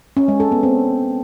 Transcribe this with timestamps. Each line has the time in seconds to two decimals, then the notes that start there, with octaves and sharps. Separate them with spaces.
0.17 C#4
0.28 G#3
0.40 A4
0.52 B3
0.63 C4